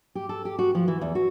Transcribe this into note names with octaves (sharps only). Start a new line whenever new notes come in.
G4
A4
G4
F#4
F3
E3
E2
F#4